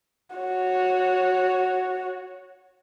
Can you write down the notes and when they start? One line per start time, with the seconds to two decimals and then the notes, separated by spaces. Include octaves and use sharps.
0.36 F#4 C#5